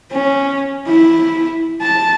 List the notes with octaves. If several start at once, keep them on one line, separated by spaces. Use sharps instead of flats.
C#4
E4
A5